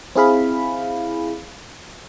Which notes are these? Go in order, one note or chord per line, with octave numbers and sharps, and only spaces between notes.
C4 E4 G#4 F5 B5